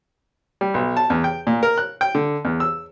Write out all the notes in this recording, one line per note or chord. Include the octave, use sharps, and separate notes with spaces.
G3
B1
A5
E2
G5
A#2
A#4
F#6
G5
D3
E2
E6